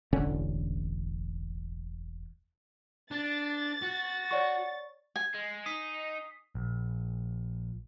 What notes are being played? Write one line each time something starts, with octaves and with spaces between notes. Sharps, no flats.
E1 A1 D3 C#4
D4 A6
F#4
C#5 D5 F#5 C#6
G#5
G#3
D#4 D#6 B6 C7
A#1